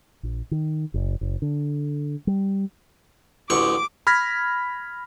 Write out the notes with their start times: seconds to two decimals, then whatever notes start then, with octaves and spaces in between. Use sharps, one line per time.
0.23 A#1
0.51 D#3
0.94 F#1
1.21 F#1
1.42 D3
2.27 G3
3.50 A1 D2 C#6 D6
4.07 B5 F6 G#6 A#6 B6